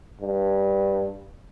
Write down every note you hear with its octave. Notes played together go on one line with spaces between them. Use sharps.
G2